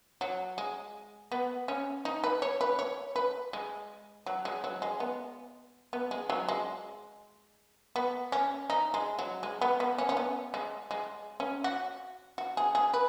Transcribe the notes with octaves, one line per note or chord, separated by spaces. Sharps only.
F#3
G#3
B3
C#4
D#4
B4
C#5
B4
C#5
B4
G#3
F#3
G#3
F#3
G#3
B3
B3
G#3
F#3
G#3
B3
C#4
D#4
G#3
F#3
G#3
B3
B3
C#4
C#4
B3
G#3
G#3
C#4
F#4
F#4
G#4
G#4
B4